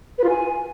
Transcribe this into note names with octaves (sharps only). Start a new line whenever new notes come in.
B4
F4
G#5